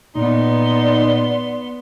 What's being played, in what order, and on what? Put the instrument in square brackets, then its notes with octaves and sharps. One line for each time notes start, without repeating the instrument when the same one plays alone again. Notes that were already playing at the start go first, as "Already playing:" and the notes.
[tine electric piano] A#2 [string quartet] B3 C6 [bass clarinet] D#4 [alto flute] D5